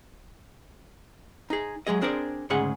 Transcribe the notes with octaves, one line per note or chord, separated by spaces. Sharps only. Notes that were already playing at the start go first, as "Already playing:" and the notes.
D#4 G#4
F#3 G#3 G#4 D#5
C4 D4 G#4 A#4 C5 D5
D2 G#2 C#3 G#4 F#5